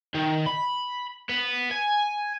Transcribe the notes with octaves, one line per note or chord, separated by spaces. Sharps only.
D#3
B5
B3
G#5